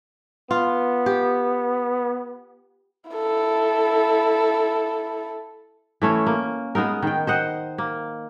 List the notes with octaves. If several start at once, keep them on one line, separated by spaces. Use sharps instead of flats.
B3 F4
G4
E4 A4
E3 A3 C#4
A#3
G#3 B3 D#4 A#4
D#3 G5
C5 D#5 F#5
A#3